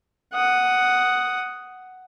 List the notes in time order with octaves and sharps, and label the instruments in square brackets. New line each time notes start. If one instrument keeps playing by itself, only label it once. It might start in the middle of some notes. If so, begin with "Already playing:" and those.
[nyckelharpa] F#5 D#6